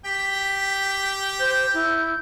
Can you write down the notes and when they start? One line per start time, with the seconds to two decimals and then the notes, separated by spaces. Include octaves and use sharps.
0.05 G4 G5 B6
1.40 C5 G6
1.74 E4